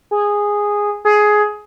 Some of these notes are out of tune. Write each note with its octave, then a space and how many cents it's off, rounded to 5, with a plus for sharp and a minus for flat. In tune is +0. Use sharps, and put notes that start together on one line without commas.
G#4 -10
G#4 +15